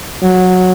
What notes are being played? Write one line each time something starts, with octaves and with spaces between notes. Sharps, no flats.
F#3